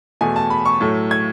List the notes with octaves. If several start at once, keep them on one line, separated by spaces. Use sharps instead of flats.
E2 B2 A3 G#5
A5
B5
C#6
A2 F#3 A3
G#6